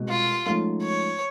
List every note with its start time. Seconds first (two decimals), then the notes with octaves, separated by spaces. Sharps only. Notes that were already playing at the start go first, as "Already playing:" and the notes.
Already playing: C2 B2 G#3
0.09 F4
0.46 G#2 F3 A3 C#4
0.82 C#5